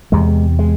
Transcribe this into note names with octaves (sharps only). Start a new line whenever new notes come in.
E2 C3 G#3
G#3